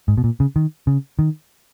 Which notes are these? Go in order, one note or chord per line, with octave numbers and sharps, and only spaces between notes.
G#2
B2
A#2
C#3
D#3
C#3
D#3